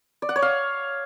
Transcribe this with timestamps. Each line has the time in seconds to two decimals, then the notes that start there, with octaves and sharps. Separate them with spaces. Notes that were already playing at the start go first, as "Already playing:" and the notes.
0.22 D5
0.29 F#5
0.36 C#5
0.42 F5